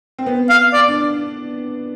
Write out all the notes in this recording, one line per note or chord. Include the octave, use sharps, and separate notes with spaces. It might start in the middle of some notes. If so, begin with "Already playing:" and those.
C4
B3
F5
D5
D4